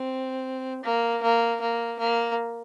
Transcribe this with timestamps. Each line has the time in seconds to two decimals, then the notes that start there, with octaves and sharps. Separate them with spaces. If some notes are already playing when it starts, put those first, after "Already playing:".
Already playing: C4
0.84 A#3
1.22 A#3
1.61 A#3
1.99 A#3